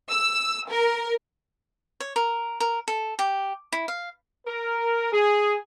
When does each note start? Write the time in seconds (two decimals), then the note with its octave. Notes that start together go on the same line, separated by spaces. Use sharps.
0.10 E6
0.69 A#4
2.00 C#5
2.16 A#4
2.60 A#4
2.88 A4
3.19 G4
3.72 E4
3.88 F5
4.47 A#4
5.13 G#4